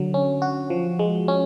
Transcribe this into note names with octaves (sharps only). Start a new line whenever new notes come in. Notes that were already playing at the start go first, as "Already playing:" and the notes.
Already playing: D3 F#3
C#4
F#4
F3
G#3
C#4